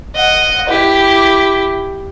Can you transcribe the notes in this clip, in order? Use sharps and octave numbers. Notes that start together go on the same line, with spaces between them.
D#5 F#5
E4 G4